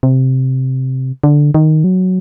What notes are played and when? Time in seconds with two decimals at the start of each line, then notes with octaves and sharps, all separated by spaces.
0.03 C3
1.24 D3
1.54 D#3
1.84 F#3